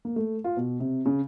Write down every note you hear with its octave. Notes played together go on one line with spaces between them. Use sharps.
A#3
A3
F4
B2
C3
C#3